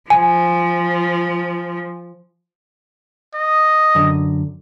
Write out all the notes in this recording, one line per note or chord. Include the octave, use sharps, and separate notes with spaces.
F3 G#5
D#5
F#2 D3